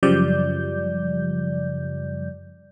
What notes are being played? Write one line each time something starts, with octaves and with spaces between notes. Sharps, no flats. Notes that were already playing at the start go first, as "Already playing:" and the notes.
F#2 C#3 F3 G3 D5 G6